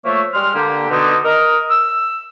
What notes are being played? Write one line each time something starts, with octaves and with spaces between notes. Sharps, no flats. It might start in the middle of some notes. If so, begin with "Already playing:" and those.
F3 A3 A#3 C#5 E5
G3 G#3 C6 F6
D3 A#3 G4
B2 D3 D#4
A#4 D#5
E6